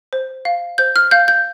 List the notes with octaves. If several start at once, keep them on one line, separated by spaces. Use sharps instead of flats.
C5
F5
C5 G6
F6
F5 G6
G6